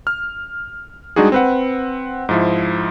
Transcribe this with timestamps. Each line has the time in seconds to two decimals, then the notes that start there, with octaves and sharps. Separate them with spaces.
0.07 F6
1.16 G3 G#3 D4 D#4 F#4 G#4
1.32 C4 B4 F#5
2.29 G#2 F3 E4